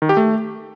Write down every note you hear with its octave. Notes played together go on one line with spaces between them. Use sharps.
D#3
G4
A3